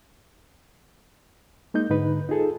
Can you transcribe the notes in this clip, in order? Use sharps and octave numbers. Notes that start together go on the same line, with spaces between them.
G#3 A#3 D#4 G6
G#2 D3 D#4 B4
D#4 F4 G#4 A4